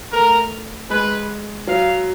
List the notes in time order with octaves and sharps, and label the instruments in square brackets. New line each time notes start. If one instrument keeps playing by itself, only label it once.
[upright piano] A3 [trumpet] A#4
[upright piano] G#3 [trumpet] B4
[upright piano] F#3 [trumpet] F5